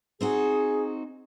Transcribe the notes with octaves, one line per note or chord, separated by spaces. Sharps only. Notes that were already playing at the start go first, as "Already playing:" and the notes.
C4 D#4 F#4 G#4